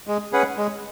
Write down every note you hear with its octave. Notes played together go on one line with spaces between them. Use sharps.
G#3
C#4 G#4 B4 F#5
G#3